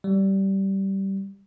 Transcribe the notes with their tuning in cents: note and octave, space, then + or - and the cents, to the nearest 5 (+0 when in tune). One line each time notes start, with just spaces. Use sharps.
G3 -15